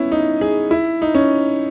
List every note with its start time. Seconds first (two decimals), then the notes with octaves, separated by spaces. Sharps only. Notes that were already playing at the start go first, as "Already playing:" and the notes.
Already playing: B3 C#4 E4
0.12 D#4
0.41 G#4
0.71 E4
1.02 D#4
1.15 C#4